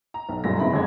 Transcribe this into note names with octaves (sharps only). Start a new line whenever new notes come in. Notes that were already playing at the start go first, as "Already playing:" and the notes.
A#5
B1
B1 F#2 A#2 G3 A3 A#6
C#3 B3 C4 D#4 E4 B5
G1 F#2 G#3 G#4 G#6